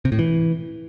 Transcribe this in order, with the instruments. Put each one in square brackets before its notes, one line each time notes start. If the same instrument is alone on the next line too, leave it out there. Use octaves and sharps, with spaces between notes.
[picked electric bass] C3
A2
E3